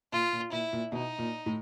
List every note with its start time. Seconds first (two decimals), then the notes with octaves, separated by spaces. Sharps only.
0.12 A#2 F4
0.33 A#2
0.52 A#2 E4
0.73 A#2
0.92 B2 D#4
1.19 A#2
1.46 A2